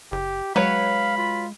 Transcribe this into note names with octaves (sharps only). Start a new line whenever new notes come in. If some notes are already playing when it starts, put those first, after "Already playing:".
F#1 G4
F#3 G#3 B4 C#5 F5 B5
F4